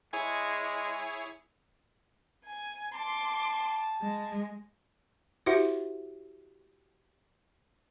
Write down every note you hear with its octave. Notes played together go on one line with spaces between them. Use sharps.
G#3 E4 G#4 C#5 G#5
G#5
A5 C6 D6
G#3
E4 F#4 G4 C5 E5 F#5